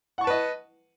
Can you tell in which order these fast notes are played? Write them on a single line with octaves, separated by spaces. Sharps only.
F#5 C#6 A5 B4 D#5